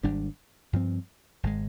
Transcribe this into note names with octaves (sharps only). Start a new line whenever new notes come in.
G#1 G#2 G3 D4
G2 F3 C4
G#1 D#3 G#3